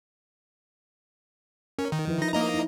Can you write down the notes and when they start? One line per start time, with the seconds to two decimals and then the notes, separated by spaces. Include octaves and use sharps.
1.79 C#4 A#4
1.92 D#3
2.07 F3 E4 B4
2.22 D#4 A#6
2.33 A#3 D#4 D#5 A#5
2.54 D#4 E4